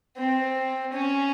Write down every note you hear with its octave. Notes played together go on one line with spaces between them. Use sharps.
C4
C#4